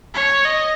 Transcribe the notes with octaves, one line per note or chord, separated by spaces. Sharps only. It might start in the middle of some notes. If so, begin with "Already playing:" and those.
C#5
D#5